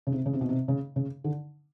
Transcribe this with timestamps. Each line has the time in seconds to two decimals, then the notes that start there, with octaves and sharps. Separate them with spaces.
0.07 C#3
0.12 C3
0.26 C#3
0.33 C3
0.41 B2
0.49 C3
0.68 C#3
0.96 C#3
1.24 D3